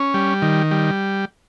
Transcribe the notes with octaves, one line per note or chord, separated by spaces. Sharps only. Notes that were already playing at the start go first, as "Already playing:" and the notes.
Already playing: C#4
G3
D#3
G3